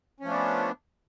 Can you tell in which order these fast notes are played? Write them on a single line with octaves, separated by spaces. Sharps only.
C#4 F3 A3 D4 B3